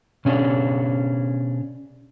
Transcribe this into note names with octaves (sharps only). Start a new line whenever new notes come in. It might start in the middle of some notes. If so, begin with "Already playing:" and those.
B2 C#4 D4